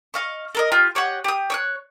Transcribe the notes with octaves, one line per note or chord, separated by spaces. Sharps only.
D#5 F5 C#6
A4 A#4 D#5
F4 G4
G4 C#5 D#5 F#5
G4 D#6
C#5 D6 F#6